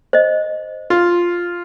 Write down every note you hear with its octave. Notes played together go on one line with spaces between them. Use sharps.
C5 D#5
F4